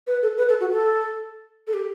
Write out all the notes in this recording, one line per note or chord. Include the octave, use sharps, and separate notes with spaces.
B4
A4
B4
A4
F#4
A4
A4
G4